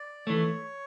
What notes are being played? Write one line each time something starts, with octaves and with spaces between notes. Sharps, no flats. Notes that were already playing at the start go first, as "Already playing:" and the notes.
Already playing: D5
E3 A3 C#5